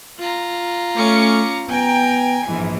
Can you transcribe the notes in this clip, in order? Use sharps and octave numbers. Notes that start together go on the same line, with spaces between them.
F4 A#5
A3 C#4 D6 C#7
B3 G5 G#5 A#5
A#1 G#2 E3